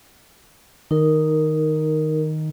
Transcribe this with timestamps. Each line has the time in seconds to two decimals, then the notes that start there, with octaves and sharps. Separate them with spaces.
0.91 D#3 D#4 A#4